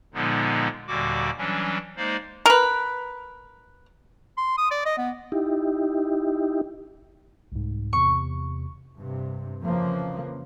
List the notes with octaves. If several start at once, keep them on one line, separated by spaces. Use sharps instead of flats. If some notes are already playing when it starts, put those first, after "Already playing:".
A#2 D3 F3 G#3 B3 D#4
D#2 A#2 D3 G3 F#4 D6
E3 F#3 G3 C#4 D4
G#3 A#3 D#4 C5 D5 F5
A#4 B4
C6
D#6
D5
D#5
B3
D#4 E4 G4
C2 G#2
E2 C3 C#6
G2 C3
F2 C#3 E3 F3 A#3